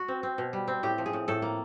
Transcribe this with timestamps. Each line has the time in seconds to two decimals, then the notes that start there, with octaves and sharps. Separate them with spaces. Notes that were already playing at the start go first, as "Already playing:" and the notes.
Already playing: F#4
0.08 C4
0.23 C4
0.38 B2
0.53 G3
0.68 C4
0.83 A2 G4
0.98 F3
1.06 G#4
1.13 A2
1.28 A2 A4
1.42 A#3